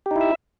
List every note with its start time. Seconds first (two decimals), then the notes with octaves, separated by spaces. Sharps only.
0.06 G4
0.11 D#4
0.16 E4
0.21 E5